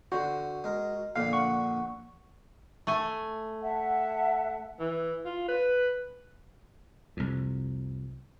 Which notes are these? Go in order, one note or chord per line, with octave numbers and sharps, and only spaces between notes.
D3 F#4 C5
G#3 A#4
A#1 A#2 D3 F5
F#5 C#6
A3 G#5
E5 F#5 A5
E3
F4
B4
C2 F2